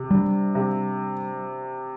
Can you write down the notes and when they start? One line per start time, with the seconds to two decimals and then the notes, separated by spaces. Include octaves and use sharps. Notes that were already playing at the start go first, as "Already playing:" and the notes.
Already playing: C3
0.11 G3 D4
0.55 C3